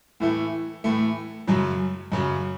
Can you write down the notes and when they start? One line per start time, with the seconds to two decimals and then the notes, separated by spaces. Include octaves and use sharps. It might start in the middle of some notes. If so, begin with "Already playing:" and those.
0.20 A2 E3 A3
0.84 A2 E3 A3
1.47 F#2 C#3 F#3
2.12 F#2 C#3 F#3